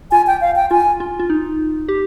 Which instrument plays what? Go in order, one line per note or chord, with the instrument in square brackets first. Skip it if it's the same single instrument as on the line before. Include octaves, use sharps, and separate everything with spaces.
[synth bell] F4 [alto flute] G#5
[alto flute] G5
F5
G5
[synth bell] F4 [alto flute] G#5
[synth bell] F4
F4
D#4
G4